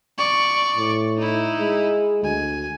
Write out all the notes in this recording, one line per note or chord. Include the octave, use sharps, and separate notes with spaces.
D5 C#6
A2
D#4 E4
G#3
D2 G#5